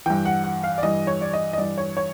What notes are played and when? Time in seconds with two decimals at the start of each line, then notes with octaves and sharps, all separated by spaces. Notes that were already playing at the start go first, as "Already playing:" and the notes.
0.06 G2 E3 G5
0.25 F#5
0.44 F#5
0.64 F5
0.78 D5
0.83 G2 E3 D#5
1.07 C#5
1.21 D5
1.33 D#5
1.53 D#5
1.58 G2 E3 D5
1.78 C#5
1.97 C#5